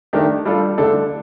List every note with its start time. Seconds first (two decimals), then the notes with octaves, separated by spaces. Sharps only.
0.13 D#3 A3 D4 G4 A#4
0.45 G3 D4 F4 A4
0.78 D3 A3 D4 A4